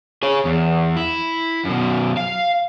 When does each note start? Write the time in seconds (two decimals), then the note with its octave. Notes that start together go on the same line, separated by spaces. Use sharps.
0.23 G#4 C#5
0.45 E2
0.96 E4
1.65 F#2 B2
2.17 F5